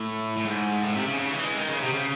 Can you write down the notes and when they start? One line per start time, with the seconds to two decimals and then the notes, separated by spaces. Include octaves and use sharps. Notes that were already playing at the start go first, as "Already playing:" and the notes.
Already playing: A2
0.37 A2
0.46 G#2
0.83 A2
0.95 C3
1.07 C#3
1.20 C#3
1.33 E3
1.44 G#3
1.57 D#3
1.69 C#3
1.81 C3
1.93 C#3